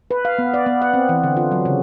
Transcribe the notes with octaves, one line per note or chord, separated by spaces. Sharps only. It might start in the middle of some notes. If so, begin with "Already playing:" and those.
B4
F5
B3
D5
B3
F#5
C4
E3
D3
F4
F#3
C#3